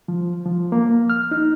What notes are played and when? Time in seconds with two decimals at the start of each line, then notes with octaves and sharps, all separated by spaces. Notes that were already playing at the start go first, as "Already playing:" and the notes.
0.08 F3
0.46 F3
0.72 A#3
1.10 F6
1.31 D#4